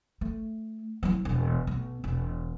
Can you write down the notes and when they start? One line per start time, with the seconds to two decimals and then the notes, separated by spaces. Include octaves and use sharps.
0.21 A3
1.03 F#3 E4
1.25 E1
1.67 B1
2.04 E1